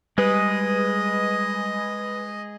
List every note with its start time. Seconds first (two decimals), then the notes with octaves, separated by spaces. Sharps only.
0.18 G3 G#3 G#4 B4 D#5